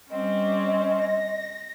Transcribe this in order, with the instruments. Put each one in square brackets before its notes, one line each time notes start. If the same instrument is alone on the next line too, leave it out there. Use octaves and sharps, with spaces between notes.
[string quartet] G3 C4 C#4 [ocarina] D#5
[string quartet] A#6